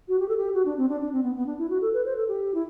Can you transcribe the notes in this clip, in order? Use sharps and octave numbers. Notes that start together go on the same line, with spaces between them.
F#4
G4
A4
G4
F#4
D4
C4
D4
D4
C4
B3
B3
D4
E4
F#4
A4
B4
C5
A4
G4
E4